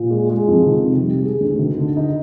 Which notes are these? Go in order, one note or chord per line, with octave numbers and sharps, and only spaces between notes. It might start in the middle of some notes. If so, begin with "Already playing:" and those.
Already playing: A#2
G#3
G#3
F2
D#3
C3
G3
G#4
D2
D#3
D3
D#4